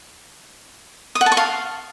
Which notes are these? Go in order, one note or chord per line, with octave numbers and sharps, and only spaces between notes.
D#6
F#5
A5
C#6
F5